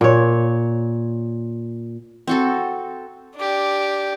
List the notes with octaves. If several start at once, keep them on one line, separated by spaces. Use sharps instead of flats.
A#2 C#5
C4 F#4 A4
D4 G4